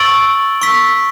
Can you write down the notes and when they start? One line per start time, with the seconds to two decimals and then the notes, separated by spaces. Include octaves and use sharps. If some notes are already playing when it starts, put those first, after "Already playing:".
Already playing: C#6 E6 A6 D7 F#7
0.61 C#6 E6 B6